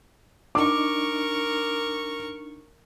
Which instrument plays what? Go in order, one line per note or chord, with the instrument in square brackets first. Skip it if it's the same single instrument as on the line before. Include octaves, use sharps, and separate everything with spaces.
[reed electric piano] D4 D#4 [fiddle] A#4 C#6 [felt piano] D6